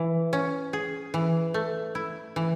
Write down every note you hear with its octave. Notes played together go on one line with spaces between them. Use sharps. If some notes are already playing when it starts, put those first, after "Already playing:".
Already playing: E3
C#4
G#4
E3
A3
E4
E3